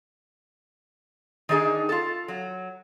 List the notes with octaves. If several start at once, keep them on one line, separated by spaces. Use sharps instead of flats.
D#3 D4 D#4 G#4
F4 A4
F#3